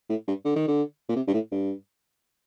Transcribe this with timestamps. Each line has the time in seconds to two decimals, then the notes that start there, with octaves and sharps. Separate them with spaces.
0.10 A2
0.28 G2
0.45 D3
0.56 D#3
0.68 D3
1.09 A#2
1.16 C3
1.27 G2
1.34 A2
1.51 G2